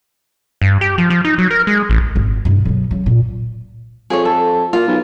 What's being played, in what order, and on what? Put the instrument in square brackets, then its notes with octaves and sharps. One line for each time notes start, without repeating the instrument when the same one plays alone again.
[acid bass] G2
G4
F3
F3
D#4
F#3
A#4
G#3
A1
[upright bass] G#1
G2 C3
B2 F#3
C#3 F#3
A#2
[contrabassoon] F2 [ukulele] G#4 C#5
[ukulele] A4
[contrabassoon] A#2 [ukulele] F4
[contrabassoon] B1